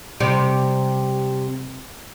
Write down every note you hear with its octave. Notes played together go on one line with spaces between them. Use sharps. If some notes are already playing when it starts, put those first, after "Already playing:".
C3 G3 G4